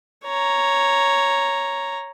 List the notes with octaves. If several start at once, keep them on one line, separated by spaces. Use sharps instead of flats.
C#5 A#5